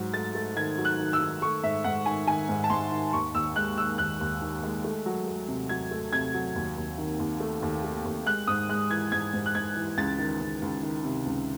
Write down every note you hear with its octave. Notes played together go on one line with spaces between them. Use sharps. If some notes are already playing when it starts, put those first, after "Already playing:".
Already playing: G#2 F#3
A3 A6
A3
D#3 G#6
F#3
F#6
D#3
E6
D#3
A3 C#6
G#2 E5
G#2 F#5
D#3 G#5
D#3 G#5
G#2
A5
G#2 C6
D#3
D#2 C#6
D#2 E6
G#3 F#6
D#3 E6
D#2 F#6
D#2
D#3
G#3
A3
F#3
A3
C3
F#3 G#6
A3
C3 G#6
F#3
D#2
D#2
D#3
D#2
A3
D#2
A3
D#2
G#3 F#6
G#2 D#6
G#3 F#6
E3 G#6
G#2 G#6
G#2
F#6
G#2 G#6
E3
C#2 A6
D#3
C#2
C#2
D#3
C3
C#2